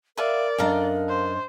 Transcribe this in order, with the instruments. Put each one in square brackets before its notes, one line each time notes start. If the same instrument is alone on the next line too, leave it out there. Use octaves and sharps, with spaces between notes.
[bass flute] A#4 [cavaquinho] B4 E5 F5 [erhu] D5
[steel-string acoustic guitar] F#2 D4 D#5 [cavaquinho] A4 F5 A#5
[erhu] C5